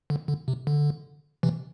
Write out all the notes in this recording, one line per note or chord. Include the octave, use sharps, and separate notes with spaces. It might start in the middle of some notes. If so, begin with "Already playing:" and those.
D3
D3
C3
D3
C3 E3